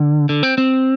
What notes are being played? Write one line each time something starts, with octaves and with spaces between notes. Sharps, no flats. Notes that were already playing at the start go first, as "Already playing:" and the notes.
Already playing: D3
D3
C4
C4